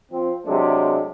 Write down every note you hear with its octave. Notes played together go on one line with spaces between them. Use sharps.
F3 C4
C3 F#3 G#3 A3 D4